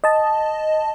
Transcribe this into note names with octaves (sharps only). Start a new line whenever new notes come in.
D#5 A5